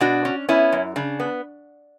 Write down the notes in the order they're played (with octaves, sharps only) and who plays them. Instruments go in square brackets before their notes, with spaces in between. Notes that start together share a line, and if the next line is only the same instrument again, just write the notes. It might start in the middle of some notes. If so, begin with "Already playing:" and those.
[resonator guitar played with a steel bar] B2 D4 F#4
C#4
B3 C#4 E4
F#2
C#3 D4
B3